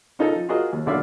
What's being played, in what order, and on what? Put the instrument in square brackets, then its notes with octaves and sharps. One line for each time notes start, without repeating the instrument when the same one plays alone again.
[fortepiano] C#4 D#4 F4 A4
F3
F4 F#4 G#4 A#4 D#5
D#2
B1 D3 D5 E5 F5